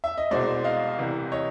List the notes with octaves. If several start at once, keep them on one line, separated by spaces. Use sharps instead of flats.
E5
D#5
C2 B2 G#3 C5 D5
D#5 F5
C2 C3 E3
C#5 D#5